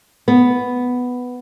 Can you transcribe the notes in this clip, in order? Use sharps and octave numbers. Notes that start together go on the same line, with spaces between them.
B3